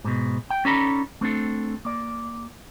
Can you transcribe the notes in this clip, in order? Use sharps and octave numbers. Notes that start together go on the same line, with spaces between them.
G#2 B2
G5
C#4 D#4 A4 D5 A#5 B5
A3 C4 D4 A4
A#3 D5